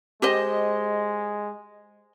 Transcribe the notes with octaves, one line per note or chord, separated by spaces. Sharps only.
G#3 G4 C5 D#5